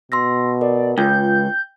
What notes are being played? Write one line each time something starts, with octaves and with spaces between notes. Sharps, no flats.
B2 C6 E6 A#6
A#4 D5
C#2 F4 G5 G6